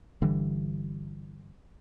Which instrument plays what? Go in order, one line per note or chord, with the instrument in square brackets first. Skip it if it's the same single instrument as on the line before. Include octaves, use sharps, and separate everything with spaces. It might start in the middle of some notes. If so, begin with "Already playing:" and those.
[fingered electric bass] G1 D3 E3 G3